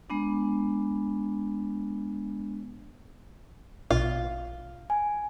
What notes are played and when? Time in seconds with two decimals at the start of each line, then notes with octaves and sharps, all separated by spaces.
0.10 G#3 B3 D4
3.90 A#1 B2 F4
4.90 G#5